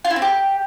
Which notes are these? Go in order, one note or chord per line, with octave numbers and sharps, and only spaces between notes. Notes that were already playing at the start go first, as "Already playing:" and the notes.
F4
E4
C4
G4